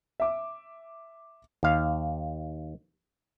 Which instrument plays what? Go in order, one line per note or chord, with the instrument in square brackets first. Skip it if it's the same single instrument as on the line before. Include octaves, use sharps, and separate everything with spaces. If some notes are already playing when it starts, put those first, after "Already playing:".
[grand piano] E5 D6
[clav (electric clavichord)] D#2 F5